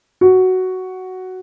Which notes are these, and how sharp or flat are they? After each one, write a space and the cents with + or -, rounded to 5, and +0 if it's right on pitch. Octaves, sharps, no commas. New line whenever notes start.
F#4 +5